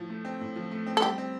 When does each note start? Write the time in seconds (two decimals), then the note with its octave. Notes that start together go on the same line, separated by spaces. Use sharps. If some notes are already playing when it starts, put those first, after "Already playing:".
Already playing: A2 F3
0.10 A3
0.25 C4
0.41 A2
0.56 F3
0.71 A3
0.86 C4
0.97 A4
1.02 G3 G4
1.18 C4